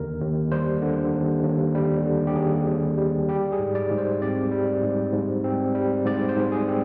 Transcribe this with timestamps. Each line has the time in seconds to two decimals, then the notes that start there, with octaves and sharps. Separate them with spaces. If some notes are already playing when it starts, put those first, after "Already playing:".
Already playing: D#2 D3 A#4
0.21 D#2
0.52 G3 C5
0.82 D3
1.13 D#2
1.43 D#2
1.75 G3
2.06 D3
2.27 G4
2.36 D#2 G#4
2.68 D#2
2.98 G3
3.28 G3 G4
3.52 G#4
3.59 G#2
3.75 D5
3.91 G#2
3.98 C5
4.22 C4 D5
4.52 G3
4.83 G#2
5.13 G#2
5.44 C4
5.75 G3
6.06 G#2 D5
6.29 C5
6.38 G#2
6.52 G#4
6.68 C4